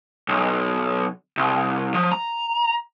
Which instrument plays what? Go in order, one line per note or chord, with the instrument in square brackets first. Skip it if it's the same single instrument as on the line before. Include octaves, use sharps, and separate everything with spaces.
[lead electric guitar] B1
C2
F3
A#5